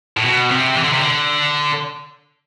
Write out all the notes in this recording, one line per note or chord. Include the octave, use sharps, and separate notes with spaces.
A2
B2
C3
E3
D3
C3
D3